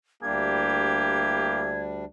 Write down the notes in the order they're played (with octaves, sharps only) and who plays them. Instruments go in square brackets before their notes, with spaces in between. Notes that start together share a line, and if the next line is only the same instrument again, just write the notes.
[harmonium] D2 G3 D4 [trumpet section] A#3 E4 G4 [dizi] G#6